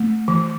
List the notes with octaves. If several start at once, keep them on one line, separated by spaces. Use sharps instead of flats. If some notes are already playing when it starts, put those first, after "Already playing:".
Already playing: A3
E3